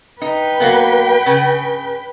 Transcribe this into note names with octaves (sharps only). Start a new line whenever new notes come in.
D#4 B4 G5
F#3 A#3 B3
C#3